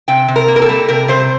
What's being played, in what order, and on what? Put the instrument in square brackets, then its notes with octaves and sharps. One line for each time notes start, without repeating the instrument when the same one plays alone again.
[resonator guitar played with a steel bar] C3 G5
C3
A#4
A#3
A#4
A4
G3
C3 A#4
C3 C5